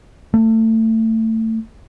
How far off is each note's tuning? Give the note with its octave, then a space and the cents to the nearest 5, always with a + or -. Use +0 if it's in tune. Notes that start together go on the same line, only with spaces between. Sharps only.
A3 +25